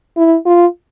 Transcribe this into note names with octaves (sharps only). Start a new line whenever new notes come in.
E4
F4